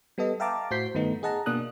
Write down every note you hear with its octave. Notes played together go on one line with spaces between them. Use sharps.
G3 B3 A4 D#5
E5 F5 G5 A5 A#5 D6
A2 F#4 C5 G6 B6 C7
G2 D#3 A3 B3 D#4
G#4 D#5 F#5 A5 A#5
B2 A#3 D4 D#6 F#6